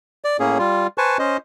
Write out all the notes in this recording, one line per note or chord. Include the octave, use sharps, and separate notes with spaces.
D5
A2 A#3 C#4 G#4
G3 F4
B4 C5 G#5 A5 C#6
C#4 C5 D#5